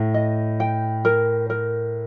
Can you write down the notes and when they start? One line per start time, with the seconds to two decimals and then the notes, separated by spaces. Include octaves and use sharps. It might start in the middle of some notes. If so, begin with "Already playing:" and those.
Already playing: A2
0.14 D#5
0.60 G5
1.05 A#4
1.50 A#4